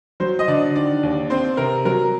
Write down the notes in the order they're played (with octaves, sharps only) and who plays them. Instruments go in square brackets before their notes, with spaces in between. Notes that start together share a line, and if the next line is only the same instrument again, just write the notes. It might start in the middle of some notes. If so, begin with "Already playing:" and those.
[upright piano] F#3 C5
D#5
D3 D5
D#3 D5
D#2
C4 C5
C3 A#4
F#3 A#4